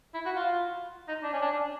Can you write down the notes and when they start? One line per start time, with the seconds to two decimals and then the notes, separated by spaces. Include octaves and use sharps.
0.14 E4
0.25 F#4
0.36 F4
1.08 D#4
1.23 D4
1.33 C#4
1.42 D4